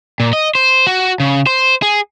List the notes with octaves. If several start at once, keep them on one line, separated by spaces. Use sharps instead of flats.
A#2
D#5
C5
F#4
C#3
C5
G#4